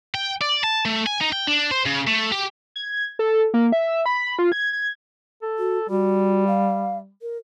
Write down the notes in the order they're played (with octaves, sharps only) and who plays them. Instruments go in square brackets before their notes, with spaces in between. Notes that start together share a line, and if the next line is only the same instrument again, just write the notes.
[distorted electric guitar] G5
D5
A5
A3
G#5
D#4
G5
D4
C5
C#3
A3
G4
[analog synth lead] G#6
A4
A#3
E5
B5
F4
G#6
G#6
[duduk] A4
[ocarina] F#4
[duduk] G3 [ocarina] F#4
[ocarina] F5
A#4